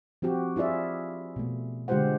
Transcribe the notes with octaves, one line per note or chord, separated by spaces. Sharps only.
F3 C4 F#4 G4
E4 F4 G#4 D5 E5
B2 A3
D3 G#3 F4 G4 C5 F#5